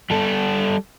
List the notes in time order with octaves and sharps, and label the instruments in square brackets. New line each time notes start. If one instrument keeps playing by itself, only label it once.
[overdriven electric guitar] G3 A4